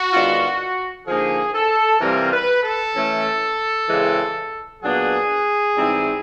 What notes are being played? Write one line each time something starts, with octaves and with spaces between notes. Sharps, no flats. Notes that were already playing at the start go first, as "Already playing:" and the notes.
Already playing: F#4
D#3 G#3 B3 D4 F4
D3 F3 A#3 D#4 G#4
A4
C3 E3 G3 C4 F4 A#4
B4
A4
E3 A3 C#4
C#3 E3 G#3 C4
A#2 F#3 B3 D4 G#4
G#2 E3 G3 C4 E4